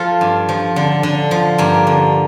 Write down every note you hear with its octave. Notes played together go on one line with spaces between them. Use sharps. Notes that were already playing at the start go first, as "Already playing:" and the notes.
Already playing: F3 F4 A4
G2
F3
D3
D3
F3
G2 A#3
D3